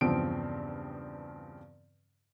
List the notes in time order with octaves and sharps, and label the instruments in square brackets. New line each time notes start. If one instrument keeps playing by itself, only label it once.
[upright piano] E2 G2 C#3 F3 C4 D7